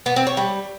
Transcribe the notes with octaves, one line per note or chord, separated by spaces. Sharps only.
B3
C4
C#5
G3